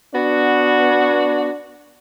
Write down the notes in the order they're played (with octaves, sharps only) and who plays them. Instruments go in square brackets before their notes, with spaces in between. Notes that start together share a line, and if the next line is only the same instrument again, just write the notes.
[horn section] B3 F#4 [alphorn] D4